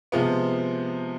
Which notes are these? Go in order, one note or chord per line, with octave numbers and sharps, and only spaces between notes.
C3 F3 G#3 B3